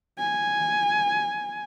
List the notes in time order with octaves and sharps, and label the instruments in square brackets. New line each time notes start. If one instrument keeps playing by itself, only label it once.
[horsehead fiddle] G#5